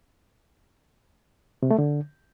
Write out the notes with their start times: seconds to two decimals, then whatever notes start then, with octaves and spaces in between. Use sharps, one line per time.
1.63 C3
1.71 A3
1.79 D3